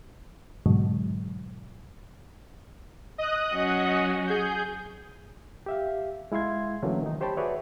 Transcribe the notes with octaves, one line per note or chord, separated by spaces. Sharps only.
G#2 B2 D3 F#3 G#3
D#5 D#6 F#6
F#3 C#4 F#4
G#4 G6
G4 E5 F5
G#3 E4 F5 C6 G#6
D3 E3 F#3 A3 A#3 C#4
D#3 D#4
G4 C5 C#5 G5 A5 B5
F#4 G#4 B4 C#5 D5 E5